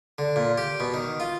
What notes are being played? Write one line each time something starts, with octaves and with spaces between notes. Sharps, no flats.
D3
A#2
G4
B2
D#3
F4